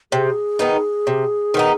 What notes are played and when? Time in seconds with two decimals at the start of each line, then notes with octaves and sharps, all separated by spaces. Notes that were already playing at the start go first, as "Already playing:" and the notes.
0.12 C3 G#4
0.59 D#3 B3 D#4
1.07 C3
1.54 D#3 B3 D#4